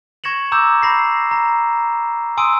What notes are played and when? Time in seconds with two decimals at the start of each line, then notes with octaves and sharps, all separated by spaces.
0.24 C#6 G#6 A#6 C#7 E7 F#7
0.52 A#5 D6 E6 G6 E7
0.82 B5 A#6 C7
1.31 A#5
2.37 G#5 C6 D#6 E6 D7 D#7